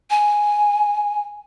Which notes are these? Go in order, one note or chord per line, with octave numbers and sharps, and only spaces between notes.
G#5